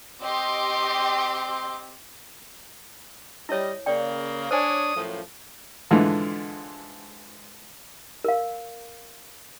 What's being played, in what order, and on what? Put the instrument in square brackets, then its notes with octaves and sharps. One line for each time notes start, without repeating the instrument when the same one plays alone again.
[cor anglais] C4 [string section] G4 D#5 [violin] C6 D6
[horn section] G3 D#5 [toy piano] E4 C#5
[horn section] C#3 A#3 [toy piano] D5 G5
[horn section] D4 C#5 [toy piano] C5 G#5 [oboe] D#6
[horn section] F#2 A2 F3
[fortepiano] G#2 D3 E3 F3
[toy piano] A#4 F5